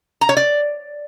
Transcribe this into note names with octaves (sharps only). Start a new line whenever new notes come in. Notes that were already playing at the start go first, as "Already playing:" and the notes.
A#5
C#5
D5